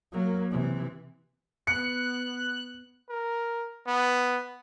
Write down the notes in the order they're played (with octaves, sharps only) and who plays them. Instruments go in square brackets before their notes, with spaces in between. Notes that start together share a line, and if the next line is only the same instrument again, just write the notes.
[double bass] F#3 A#3
C3 E3
[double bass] B3 [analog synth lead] F#6 [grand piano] C#7
[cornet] A#4
B3